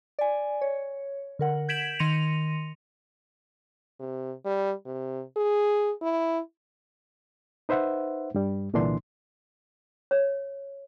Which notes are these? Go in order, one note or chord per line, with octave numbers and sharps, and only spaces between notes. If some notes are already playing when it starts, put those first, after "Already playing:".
D5 G#5
C#5
D3 A#4 F#5
G6 G#6 B6 D7 E7 F#7
D#3 C6 A#6 C#7 D#7 F7
C3
G3
C3
G#4
E4
D#4 B4 C5 E5 F#5
G2 G3
C2 A#2 D3 E3 D4 C6
C#5